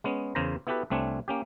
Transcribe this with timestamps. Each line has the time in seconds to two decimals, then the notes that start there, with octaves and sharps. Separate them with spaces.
0.04 G#3 B3 C#4
0.35 E2 C#3 A#4 C5 A#5
0.67 B3 E4 F#4 G4 A4 B4
0.90 C2 A3 C4 D4 C#5 G#5
1.28 A#3 C#4 G4